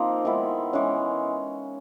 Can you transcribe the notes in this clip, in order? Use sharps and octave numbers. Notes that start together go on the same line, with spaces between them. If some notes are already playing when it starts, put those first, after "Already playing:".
Already playing: F3 A#3 C4 D#4
D#3 G#3 B3 E4
E3 G#3 C#4